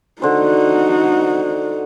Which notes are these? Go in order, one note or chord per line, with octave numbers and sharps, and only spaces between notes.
D3 D#4 F#4 C5